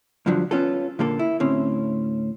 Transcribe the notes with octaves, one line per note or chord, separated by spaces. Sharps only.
G2 D3 F3 F#3 D4
B3 C#4 F4 A4
A#2 D3 A#3 A4
E4
D2 A2 C4 C#4